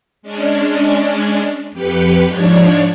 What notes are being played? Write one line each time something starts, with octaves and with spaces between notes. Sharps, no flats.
G#3 C#4 D4
F2 G4 B4 C#7
G#2 F3 D4 C#5